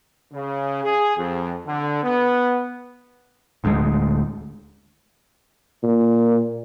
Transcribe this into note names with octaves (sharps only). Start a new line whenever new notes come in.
C#3
G#4
F2
D3
B3
D1 D2 D3 G#3
A#2